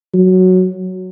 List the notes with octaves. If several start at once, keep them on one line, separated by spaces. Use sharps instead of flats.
F#3